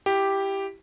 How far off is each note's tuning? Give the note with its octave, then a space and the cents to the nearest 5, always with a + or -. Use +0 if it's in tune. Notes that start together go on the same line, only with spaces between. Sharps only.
E4 +15 G4 +0